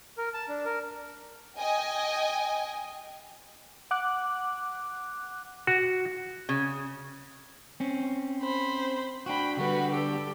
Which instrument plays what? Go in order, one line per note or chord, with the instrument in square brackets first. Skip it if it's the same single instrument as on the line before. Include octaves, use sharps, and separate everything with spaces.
[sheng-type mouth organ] A#4
A5
D4
A#4
[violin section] D#5 G5 G#5
[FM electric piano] F#5 D6 F#6
[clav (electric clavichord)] F#4
[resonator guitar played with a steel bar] C#3
[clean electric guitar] C4 C#4
[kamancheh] C5 B5
[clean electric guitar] D4 F#4 [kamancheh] G5 B5
[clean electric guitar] D3 G3 [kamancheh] F#4 B4
[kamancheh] G4 A4